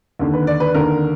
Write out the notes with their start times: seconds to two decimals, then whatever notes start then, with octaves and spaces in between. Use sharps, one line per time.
0.19 D#2 D3
0.33 B4
0.47 D5
0.60 B4
0.74 D#2 D3 A#4